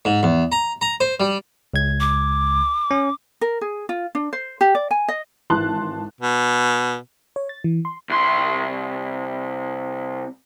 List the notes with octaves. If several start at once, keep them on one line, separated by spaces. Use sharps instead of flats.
G#2
E2
A#5
A#5
C5
G3
C#2 G#6
D6
C#4
A#4
G#4
F4
D4
C5
G4
D5
G#5
D#5
G#1 E3 A5 C6 F#6
B2
C#5
A6
E3
C6
C2 C6